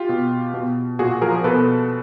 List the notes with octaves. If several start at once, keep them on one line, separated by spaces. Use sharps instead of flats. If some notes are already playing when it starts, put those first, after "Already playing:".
Already playing: F4 G4
B2
B2
A#2 F#4 G#4
F3 G#4 A#4
B2 A4 B4